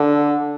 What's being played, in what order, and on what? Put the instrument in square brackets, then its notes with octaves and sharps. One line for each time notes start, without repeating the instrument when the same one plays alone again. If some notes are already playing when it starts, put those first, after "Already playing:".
Already playing: [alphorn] D3